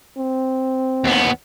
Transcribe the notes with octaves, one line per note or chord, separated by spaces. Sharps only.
C4
D#2 B3